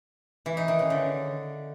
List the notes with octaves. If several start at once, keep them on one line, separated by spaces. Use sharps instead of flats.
E3
D#4
D#3
C#3
D3